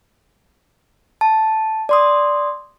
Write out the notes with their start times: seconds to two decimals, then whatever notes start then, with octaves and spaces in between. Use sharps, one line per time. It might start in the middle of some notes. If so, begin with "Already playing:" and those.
1.21 A5
1.89 D5 C6 D#6